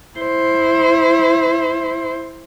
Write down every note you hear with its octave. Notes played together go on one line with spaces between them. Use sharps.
E4 C5